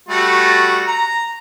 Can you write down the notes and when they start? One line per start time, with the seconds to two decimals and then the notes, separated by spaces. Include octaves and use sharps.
0.09 G3 A3 F#4
0.87 A#5